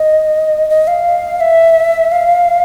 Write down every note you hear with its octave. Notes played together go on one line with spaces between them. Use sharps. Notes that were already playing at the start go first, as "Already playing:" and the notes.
Already playing: D#5
D#5
F5
E5
F5